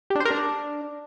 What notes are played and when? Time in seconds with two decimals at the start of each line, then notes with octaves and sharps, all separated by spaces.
0.10 G4
0.15 D4
0.20 C5
0.25 A#4
0.30 D4